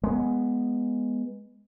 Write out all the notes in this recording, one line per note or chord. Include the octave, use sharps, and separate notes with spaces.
G#3 A#3 B3